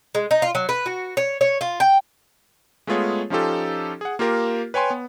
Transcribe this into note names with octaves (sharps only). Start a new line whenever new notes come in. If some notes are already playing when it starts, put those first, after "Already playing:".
G#3
D#4
F4
F#3
B4
F#4
C#5
C#5
F4
G5
G#3 A3 B3 F4 G#4 C#5
F3 C#4 D#4 F4 G4 A4
G#4 F#5
A#3 F4 G4 A#4
B4 C#5 G5 G#5 C6
B3